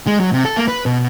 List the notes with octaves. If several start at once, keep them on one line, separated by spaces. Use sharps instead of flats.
G#3
F#3
C3
A4
A#3
B4
B2